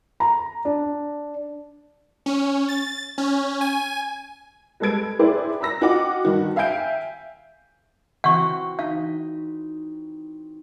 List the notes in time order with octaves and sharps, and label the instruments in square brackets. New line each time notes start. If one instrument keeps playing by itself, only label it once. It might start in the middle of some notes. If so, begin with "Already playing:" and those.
[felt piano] A#5
D4
[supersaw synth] C#4
A6
C#4
G#5
[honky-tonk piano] G3 G#3 A4 B4 G#6 D7
E4 G4 G#4 B4 C5 D5
A#5 B5 E6 A#6
F4 F#4 D#5 F#5 G5 D6
G2 D#3 F#4
E5 F5 G5 G#5 G6 D7
[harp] E3 C4 F#4 [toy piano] F#5 C#6
[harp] D#4 [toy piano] F5